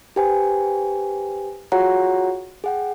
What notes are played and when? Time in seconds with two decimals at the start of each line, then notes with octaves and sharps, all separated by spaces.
0.16 G4 B4 C5 G5 G#5
1.72 F4 F#4 G#4 C#5 F#5 A#5
2.64 G#4 F#5 G5